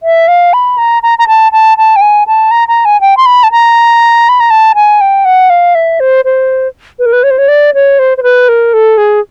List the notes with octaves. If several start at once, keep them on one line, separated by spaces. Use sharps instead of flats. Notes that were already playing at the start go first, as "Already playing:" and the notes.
E5
F5
B5
A#5
A#5
A#5
A5
A5
A5
G5
G#5
A5
A#5
A#5
G#5
G5
C6
B5
A5
A#5
B5
A#5
A5
G#5
G5
F#5
F5
E5
C5
C5
B4
A#4
B4
C#5
C5
C#5
D5
C#5
C5
C5
B4
A#4
A4
G#4